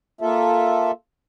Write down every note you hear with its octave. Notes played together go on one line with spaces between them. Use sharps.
A#3 F4 A4 E5